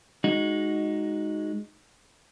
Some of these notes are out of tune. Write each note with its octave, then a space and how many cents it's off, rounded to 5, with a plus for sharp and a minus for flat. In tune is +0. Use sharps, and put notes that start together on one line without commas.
G#3 +0 D#4 +0 F#4 +0